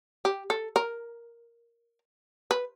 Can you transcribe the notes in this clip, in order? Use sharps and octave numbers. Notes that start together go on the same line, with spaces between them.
G4
A4
A#4
B4